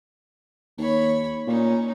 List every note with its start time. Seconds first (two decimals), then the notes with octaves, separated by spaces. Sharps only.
0.78 D#2 C#5 B5
1.47 A#2 C#4 D#4